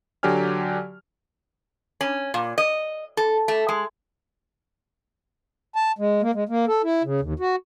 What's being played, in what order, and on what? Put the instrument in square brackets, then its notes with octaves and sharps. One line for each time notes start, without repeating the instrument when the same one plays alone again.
[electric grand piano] D3 F#3 G4 D5 G#5 F6
[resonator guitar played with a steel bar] C#4
A#2
D#5
A4
A3
G#3
[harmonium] A5
G#3
A#3
G#3
A#3
A4
E4
C#3
D#2
F#4